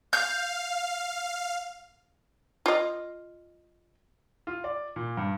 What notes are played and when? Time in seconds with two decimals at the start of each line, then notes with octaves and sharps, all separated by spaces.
0.13 F5 G6
2.66 F4 D#5
4.47 F4
4.64 D5
4.96 A#2
5.17 G2